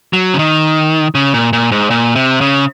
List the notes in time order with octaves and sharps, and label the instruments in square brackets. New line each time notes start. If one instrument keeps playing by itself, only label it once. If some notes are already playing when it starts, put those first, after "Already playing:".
[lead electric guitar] F#3
C#3
D#3
C#3
A#2
A#2
G#2
A#2
C3
C#3